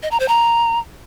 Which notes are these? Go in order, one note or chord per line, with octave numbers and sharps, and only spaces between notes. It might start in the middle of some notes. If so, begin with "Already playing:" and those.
D#5
A#5
C5
A#5